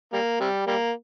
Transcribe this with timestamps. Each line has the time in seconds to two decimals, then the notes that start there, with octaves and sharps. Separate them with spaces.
0.13 G3 A#3
0.40 C3 G3
0.67 G3 A#3